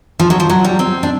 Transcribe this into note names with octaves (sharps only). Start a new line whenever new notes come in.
F3
F#3
F3
F#3
G3
C4
D4